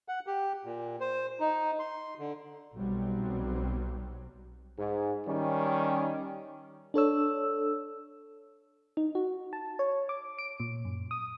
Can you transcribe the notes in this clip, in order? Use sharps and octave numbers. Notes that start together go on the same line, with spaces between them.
F#5
G4
A#2
C5
D#4
C6
D3
B1 F#3 G3 C4
G#2
D#3 G3 C#4
D4 A4 C#5 E6
D#4
F#4
A5
C#5
D6
D7
A#2
F#2
D#6